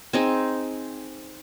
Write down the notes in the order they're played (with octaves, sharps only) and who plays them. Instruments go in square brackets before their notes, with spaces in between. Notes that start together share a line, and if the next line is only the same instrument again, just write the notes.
[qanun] C4 D#4 G#4